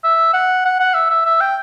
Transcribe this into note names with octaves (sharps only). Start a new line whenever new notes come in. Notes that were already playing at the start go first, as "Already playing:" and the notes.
E5
F#5
F#5
F#5
E5
E5
E5
G5